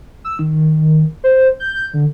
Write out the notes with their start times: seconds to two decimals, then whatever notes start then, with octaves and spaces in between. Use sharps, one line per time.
0.25 E6
0.39 D#3
1.24 C5
1.60 G6
1.94 D3